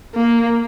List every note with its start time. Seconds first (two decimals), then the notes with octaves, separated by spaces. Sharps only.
0.15 A#3